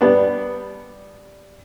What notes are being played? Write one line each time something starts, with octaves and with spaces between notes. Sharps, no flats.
G3 B3 D4